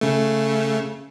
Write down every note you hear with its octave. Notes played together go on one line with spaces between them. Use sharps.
C#3 A3